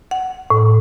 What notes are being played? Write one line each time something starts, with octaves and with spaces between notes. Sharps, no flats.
F#5
A2